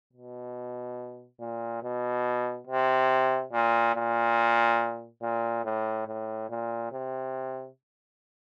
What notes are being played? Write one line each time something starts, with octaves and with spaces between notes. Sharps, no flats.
B2
A#2
B2
C3
A#2
A#2
A#2
A2
A2
A#2
C3